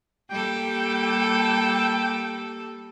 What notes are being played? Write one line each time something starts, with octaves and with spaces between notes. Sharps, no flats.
G3 A#3 A4 G5